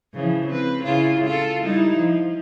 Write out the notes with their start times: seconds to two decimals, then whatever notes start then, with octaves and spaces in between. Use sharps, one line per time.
0.13 C#3 E3 F3
0.47 C4 B4
0.83 C#3 E4 F4
1.25 F4 A4
1.64 G3 D#4 E4
1.97 F3